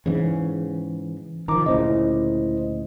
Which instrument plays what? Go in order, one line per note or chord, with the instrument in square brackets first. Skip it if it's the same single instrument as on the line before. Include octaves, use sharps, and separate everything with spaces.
[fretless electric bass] G#2 C#3 [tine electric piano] E3
[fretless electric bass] D#3 F3 [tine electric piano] A#5 D6
[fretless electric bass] D2 A#2 C#3 [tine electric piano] E4 C5 D#5